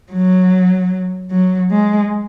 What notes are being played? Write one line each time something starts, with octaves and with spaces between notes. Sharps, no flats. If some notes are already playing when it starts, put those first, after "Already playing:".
F#3
F#3
G#3